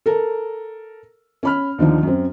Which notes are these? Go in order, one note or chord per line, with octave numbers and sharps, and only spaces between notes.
A4 A#4
C#4 B5 F6
D#2 D3 F3 D#4
F#2 C4